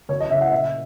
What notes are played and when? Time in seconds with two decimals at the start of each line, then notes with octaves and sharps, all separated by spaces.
0.09 F#2 C#5
0.20 D#5
0.30 C#3 E5
0.41 F#5
0.52 A#2 E5